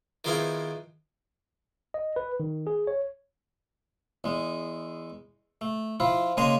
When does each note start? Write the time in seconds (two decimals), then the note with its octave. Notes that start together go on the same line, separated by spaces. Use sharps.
0.24 D#3 F3 G#3 B3 C4 E4
1.94 D#5
2.16 B4
2.40 D#3
2.67 G#4
2.87 C#5
4.24 E2 G#3
5.61 A3
6.00 F3 E4 F4
6.37 C#3 G#3 A#3 G#5 A#5 C6